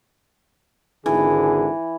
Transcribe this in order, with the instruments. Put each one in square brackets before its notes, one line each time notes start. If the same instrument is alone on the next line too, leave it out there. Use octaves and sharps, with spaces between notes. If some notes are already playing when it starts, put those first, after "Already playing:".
[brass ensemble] G#1 D3 G#4 [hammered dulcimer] E3